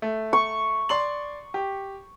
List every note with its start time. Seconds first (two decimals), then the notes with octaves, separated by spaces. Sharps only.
0.02 A3
0.33 C#6
0.89 D5 C6 F#7
1.54 G4